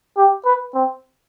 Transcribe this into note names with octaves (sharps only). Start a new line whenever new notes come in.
G4
B4
C4